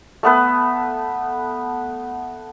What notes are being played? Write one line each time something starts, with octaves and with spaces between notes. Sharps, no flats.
A3 B3 B4